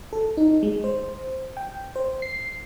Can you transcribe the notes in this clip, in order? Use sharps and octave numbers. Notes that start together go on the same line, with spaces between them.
A4
D#4
G#3
C5
G5
C5
C7